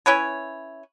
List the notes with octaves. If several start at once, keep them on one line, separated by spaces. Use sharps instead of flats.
C#4 E4 B4 C#5